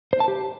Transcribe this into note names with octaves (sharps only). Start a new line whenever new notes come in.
C5
A5
G4